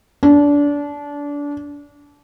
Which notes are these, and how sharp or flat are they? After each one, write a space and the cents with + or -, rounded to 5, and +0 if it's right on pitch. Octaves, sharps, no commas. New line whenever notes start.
D4 -25